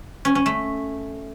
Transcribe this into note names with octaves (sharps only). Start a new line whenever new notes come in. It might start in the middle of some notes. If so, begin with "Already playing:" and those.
C#4
C#4
A3